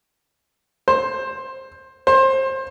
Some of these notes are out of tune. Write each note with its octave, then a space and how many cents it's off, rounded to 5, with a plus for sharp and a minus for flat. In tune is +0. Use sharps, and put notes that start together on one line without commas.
C5 +15
C5 +25